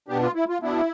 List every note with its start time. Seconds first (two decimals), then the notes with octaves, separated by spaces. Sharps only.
0.08 B2 B3 D4 G4
0.22 F4
0.35 E4
0.49 F4
0.62 B2 B3 D4 E4